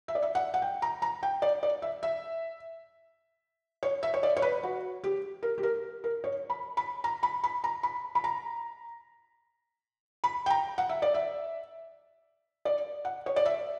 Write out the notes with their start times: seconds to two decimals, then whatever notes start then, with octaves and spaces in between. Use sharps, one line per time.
0.08 E5
0.15 D5
0.22 E5
0.35 F#5
0.54 F#5
0.62 G5
0.82 A#5
1.02 A#5
1.23 G5
1.42 D5
1.63 D5
1.82 E5
2.03 E5
3.83 C#5
4.03 E5
4.14 C#5
4.23 D5
4.37 C#5
4.42 B4
4.63 F#4
5.04 G4
5.43 A#4
5.58 G4
5.63 A#4
6.04 A#4
6.24 C#5
6.50 B5
6.77 B5
7.04 A#5
7.23 B5
7.44 B5
7.64 A#5
7.83 B5
8.15 B5
8.24 A#5
10.24 B5
10.46 G5
10.50 A#5
10.78 F#5
10.89 E5
11.02 D5
11.14 E5
12.65 D5
13.05 F#5
13.26 C#5
13.36 D5
13.46 E5